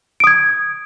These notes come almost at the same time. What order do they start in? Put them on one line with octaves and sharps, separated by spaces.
D7 D#6 G#6